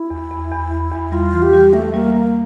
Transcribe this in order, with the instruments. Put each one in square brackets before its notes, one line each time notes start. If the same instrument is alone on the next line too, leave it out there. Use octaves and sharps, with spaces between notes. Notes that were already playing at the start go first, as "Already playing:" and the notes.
Already playing: [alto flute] E4
[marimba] E2
E2
E2
E2
E2
[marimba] G3 [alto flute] F4
[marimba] E3
[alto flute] G4
[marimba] G3
[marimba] G3 [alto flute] A3
[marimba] G3 [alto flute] A#3
[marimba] G3 [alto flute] A#3